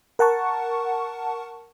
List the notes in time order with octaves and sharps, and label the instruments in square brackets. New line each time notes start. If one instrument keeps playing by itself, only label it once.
[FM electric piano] A#4 F#5 A5 C#6